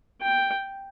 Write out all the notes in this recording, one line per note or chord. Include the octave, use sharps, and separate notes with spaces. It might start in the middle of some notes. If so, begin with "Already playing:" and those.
G5